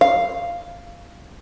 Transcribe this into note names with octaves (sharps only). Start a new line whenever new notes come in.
F5